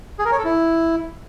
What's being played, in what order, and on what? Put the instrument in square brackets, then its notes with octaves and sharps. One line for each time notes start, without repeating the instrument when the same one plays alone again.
[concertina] G#4
A#4
C#5
A4
E4